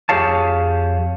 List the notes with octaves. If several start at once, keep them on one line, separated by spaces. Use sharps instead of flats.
F2 G4 G#4 C#5 F5 A5